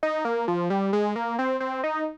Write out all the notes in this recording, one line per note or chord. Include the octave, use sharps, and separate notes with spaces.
D#4
A#3
F3
G3
G#3
A#3
C4
C4
D#4